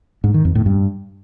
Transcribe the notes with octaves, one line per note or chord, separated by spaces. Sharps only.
G#2
D#3
F2
A2
G2